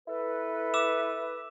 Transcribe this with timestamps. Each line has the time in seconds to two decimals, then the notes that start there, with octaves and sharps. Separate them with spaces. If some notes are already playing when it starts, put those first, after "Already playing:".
0.08 E4 A4 B4
0.74 D6 E6 E7